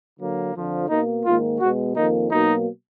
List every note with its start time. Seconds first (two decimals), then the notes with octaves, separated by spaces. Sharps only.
0.19 D3 F#3 A#3
0.54 F2 D3 F3
0.89 B2 A#3 D#4
1.25 G#2 D#3 A#3 F4
1.60 B2 G#3 B3 F#4
1.96 F2 D#3 A#3 D#4
2.31 B2 F#3 A#3 D#4